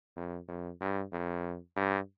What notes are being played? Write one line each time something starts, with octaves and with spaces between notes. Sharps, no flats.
F2
F2
G2
F2
G2